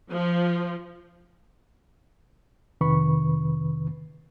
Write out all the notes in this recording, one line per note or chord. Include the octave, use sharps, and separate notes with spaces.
F3
F2 C3 D#3 B4 B5 C#6